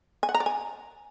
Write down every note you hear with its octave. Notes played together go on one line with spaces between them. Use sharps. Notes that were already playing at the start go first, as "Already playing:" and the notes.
G#5
F#5
A#5
D5
G#5